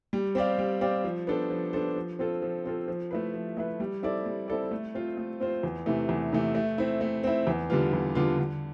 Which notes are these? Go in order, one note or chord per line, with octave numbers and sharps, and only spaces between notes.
G3
C4 G4 D5 F5
G3
C4 G4 D5 F5
F3
B3 D4 A4 C5
F3
B3 D4 A4 C5
F3
C4 F4 A4
F3
C4 F4 A4
F3
A3 E4 B4
F3
A3 E4 B4
G3
C4 E4 A4 D5
G3
C4 E4 A4 D5
A3
C4 F4 C5
A3
C4 F4 C5
E2
C3 E3 A3
E2
C3 E3 A3
A3
C4 E4
A3
C4 E4
E2
D3 G3 B3 F4
E2
D3 G3 B3 F4
D3